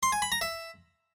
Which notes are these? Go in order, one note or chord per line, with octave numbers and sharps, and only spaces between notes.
C6
G#5
B5
A#5
E5